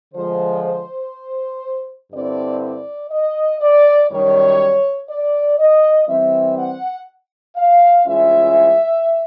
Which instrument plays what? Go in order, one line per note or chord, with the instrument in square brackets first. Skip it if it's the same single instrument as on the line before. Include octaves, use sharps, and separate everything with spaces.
[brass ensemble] D3 F3 G#3 C5
C5
G2 D3 G3 C4 E4 D5
D5
D#5
D5
F#2 D#3 G3 C#5
D5
D#5
E3 G3 C4 E5
F#5
F5
G2 E3 G#3 C#4 F4 E5